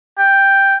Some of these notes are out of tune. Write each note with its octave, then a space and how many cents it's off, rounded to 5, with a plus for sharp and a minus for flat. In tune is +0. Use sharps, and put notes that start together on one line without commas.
G5 +5